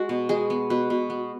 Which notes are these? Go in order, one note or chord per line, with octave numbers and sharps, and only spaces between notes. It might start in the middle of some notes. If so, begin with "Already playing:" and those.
Already playing: G#3 F#4
B2
G#3 G#4
B3
B2 B4
B2
B3